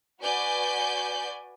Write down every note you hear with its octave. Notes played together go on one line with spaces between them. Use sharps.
F#4 B4 D5 G#5 G6